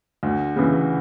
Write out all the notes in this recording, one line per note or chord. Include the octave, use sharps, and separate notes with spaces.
D2
C#3 E3